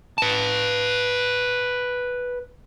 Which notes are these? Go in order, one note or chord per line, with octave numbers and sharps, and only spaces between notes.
B4 A5